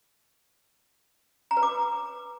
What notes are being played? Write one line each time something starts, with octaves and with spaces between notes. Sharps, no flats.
A#5
B4
D6